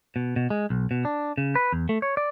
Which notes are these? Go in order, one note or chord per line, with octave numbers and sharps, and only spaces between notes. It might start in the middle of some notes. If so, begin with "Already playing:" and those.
B2
B2
G#3
B1
B2
D4
C#3
B4
E2
A3
C#5
D5